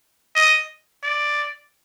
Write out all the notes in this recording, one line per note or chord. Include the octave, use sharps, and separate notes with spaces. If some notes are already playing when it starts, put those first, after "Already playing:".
D#5
D5